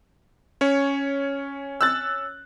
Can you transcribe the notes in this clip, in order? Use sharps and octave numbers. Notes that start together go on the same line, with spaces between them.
C#4 C#5
E6 F#6 A6